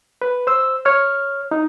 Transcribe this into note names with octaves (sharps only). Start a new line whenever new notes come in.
B4
C5 E6
C#5 F6
D#4